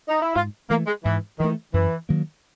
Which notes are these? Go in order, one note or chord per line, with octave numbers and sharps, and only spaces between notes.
D#4
E4
G#2 F4
E3 A3 A#3
G#3
G#2 E3
D#3 E3 A3
F#2 E3
D#3 F#3 A#3